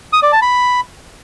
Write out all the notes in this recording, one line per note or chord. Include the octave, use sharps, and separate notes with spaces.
D#6
D5
A5
B5